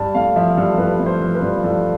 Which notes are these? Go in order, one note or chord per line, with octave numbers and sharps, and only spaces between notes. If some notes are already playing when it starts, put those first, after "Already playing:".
Already playing: G2 A5
A3 F5
F3 E5
G2 A4
G2 B4
A3
C5
F3
B4
G2
G2 A4